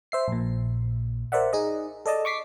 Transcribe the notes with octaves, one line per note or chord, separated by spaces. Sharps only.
C5 E5 C7
A#1 A#2
A#4 C5 D5 E5 F#5
D#4 G#4 D#5
A4 D5 D#5 A5
C#6 D6 B6 C7